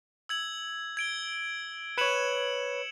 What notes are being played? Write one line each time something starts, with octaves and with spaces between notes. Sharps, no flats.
E6 G#6 F#7
G#6 D7 G7
B4 C#5 C#7 E7 F#7